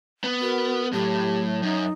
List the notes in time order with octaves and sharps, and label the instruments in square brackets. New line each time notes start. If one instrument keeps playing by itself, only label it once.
[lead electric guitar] B3
[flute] F#4 [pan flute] A#4
[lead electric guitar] A2 [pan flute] F#3 [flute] G4
[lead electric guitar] F#2 [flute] D#4